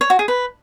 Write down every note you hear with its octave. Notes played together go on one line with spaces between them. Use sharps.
C#5
F#4
G#4
B4